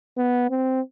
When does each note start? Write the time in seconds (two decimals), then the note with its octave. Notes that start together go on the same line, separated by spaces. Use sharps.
0.17 B3
0.50 C4